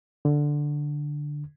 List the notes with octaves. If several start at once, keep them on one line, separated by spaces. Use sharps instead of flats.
D3